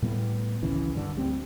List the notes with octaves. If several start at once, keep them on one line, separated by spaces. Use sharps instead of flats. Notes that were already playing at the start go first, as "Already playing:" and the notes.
A2 G3 B3
G#1 C#2 C#3 E3
G2 D3
D2 G3 C4